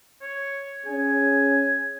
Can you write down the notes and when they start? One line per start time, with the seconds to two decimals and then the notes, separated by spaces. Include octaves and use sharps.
0.21 C#5
0.86 C#4 G#4 G#5